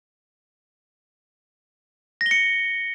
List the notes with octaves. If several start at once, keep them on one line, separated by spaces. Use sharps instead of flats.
A#6
G7
C#7